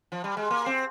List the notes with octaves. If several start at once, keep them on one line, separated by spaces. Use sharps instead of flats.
F3
G3
G#3
A#3
C4